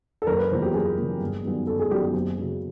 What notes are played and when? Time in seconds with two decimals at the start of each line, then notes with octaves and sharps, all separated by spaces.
0.22 A4
0.27 F#1 A#4
0.39 B4
0.50 E2 C#3 F3 A#3 C5
0.63 G4
0.74 F#1 G#4
0.98 E2 C#3 F3 A#3
1.21 G1
1.43 F#2 D#3 G3 B3
1.67 G1 A4
1.79 G#4
1.90 F#2 D#3 G3 B3 G4
2.02 G4
2.13 F#1
2.38 F#2 C#3